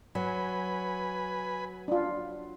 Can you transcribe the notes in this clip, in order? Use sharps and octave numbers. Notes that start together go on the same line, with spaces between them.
F#3 B4 G#5 B5
D4 F4